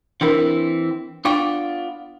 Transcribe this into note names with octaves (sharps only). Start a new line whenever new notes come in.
E3 C4 D4 E4 A#4
B3 D4 F4 D5 G5 C#6